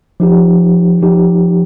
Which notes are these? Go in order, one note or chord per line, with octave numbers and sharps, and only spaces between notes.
F3 D#4 G4
F3 D#4 G4